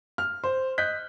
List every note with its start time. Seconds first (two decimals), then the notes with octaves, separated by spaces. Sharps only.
0.18 F6
0.44 C5
0.78 D#5 F#6 G6 B6